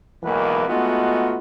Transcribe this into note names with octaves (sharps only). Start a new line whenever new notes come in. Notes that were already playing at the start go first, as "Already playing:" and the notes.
B1 E2 E3 G#3 A#3 B4
G#3 A3 B3 D#4 F4 F#4